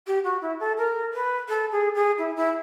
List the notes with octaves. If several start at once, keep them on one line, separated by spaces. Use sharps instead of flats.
G4
F#4
E4
A4
A#4
B4
A4
G#4
G#4
E4
E4